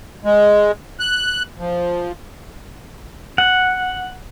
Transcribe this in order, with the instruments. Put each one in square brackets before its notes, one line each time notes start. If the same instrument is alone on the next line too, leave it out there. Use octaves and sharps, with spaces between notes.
[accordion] G#3
F#6
F3
[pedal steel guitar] F#5